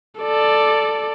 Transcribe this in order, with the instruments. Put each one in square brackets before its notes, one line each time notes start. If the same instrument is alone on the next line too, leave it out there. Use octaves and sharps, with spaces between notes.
[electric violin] A4 D5